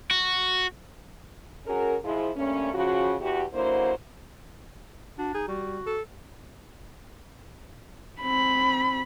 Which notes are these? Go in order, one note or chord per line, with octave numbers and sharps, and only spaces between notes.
F#4
C#4 F#4 G#4 A#4
F3 G#3 E4
G2 A3 A#3 C#4
C#3 F3 F#4
E2 E3 F#4 G4
D3 F#3 A#3 E4 C5
D4 F#4
D#4 G#4
G3 F#4
A4
C4 B5